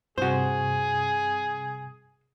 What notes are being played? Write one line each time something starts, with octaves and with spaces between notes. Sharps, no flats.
G2 C3 F#4 G#4 C5